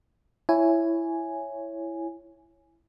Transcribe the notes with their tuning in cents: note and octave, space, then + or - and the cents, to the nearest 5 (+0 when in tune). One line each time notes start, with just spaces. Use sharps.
E4 +10 C#5 +0 G#5 +0